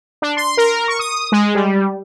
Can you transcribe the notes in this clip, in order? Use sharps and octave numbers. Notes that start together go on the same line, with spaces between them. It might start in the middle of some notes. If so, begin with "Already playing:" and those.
D4
C6
A#4
C#6
D#6
G#3
G3